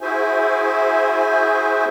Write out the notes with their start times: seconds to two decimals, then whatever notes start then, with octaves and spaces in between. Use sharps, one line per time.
0.01 E4 F#4 G#4 C5 E5 G#5